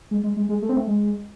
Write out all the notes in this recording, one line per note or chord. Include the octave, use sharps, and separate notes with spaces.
G#3
G#3
G#3
G#3
A3
C4
A3
G#3